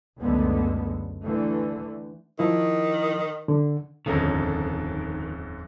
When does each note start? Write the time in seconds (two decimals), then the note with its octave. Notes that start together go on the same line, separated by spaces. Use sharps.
0.18 C#2 F#2 D3 G#3 A3 B3
1.23 D3 E3 A3
2.39 D#3 F3 E4
3.48 D3
4.06 D#1 F2 G#2 D3 D#3 C#4